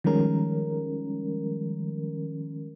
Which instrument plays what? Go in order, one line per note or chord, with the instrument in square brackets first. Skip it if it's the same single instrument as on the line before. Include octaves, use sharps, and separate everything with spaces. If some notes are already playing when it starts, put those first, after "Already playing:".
[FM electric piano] D#3 F3 G3 G#3 C#4 A#4